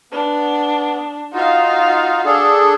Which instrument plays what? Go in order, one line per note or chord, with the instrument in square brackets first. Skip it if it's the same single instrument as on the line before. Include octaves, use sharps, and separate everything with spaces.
[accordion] B3 [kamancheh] D4
[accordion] D#4 F4 [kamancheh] F#4 F5
[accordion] D4 G#4 A4